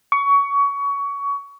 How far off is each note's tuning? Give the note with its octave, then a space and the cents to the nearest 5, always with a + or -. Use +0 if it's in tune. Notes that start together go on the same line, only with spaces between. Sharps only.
C#6 +25